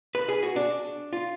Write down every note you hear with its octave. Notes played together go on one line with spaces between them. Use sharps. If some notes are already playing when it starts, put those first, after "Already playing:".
B4
G#4
F#4
D4
F4